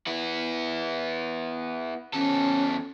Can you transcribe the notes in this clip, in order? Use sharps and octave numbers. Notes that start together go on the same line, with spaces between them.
B3 E4
E2 C#4 A4